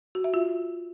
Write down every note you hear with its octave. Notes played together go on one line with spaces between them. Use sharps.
F#4
E5
F4